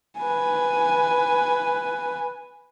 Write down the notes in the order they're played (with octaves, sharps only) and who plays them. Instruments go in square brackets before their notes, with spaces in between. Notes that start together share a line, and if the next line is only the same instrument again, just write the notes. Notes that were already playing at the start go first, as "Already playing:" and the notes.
[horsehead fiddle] B4 G#5